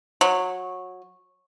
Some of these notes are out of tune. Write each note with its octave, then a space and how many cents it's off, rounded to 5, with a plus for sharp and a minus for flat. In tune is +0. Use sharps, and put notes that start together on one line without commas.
F#3 -20